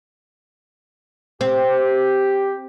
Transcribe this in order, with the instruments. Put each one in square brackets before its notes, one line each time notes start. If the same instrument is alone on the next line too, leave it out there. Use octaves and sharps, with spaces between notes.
[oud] C4 [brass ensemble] G4